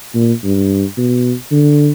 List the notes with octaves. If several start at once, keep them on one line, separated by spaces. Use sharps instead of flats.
A#2
G2
B2
D3